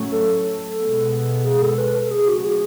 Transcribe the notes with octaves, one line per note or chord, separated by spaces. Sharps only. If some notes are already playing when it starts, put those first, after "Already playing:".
Already playing: A2 F#3 A3 C#4
A4
B2 G#3 B3
G#4
A4
B4
A4
C#3 F#3 A3 C#4 G#4
F#4
G#4